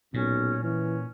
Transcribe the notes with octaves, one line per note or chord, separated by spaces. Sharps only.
B1 A#2 C#4
E3 C#4